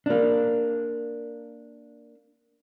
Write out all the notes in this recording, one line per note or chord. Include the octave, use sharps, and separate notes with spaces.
A#3 D4